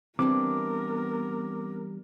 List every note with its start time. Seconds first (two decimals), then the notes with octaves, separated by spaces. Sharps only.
0.19 E3 G3 B3 C4 D4 A#4 D6